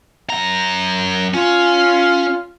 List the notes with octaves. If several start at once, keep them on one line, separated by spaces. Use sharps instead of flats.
F#2 A#5
C#4 F4